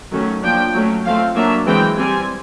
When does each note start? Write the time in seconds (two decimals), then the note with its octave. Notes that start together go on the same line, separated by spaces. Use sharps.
0.12 D#3 F#3 A3 C#4
0.43 F3 A#3 D4 G5
0.75 F#3 A3 C#4
1.05 F3 A3 C4 F5
1.36 F#3 A#3 D4 E5
1.68 E3 G#3 C4 G5
1.98 G3 C4 G#5